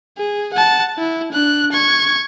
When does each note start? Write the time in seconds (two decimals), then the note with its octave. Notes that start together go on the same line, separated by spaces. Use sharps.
0.18 G#4
0.53 F#5 A5
0.98 E4
1.32 D4 F#6
1.72 C#6 G#6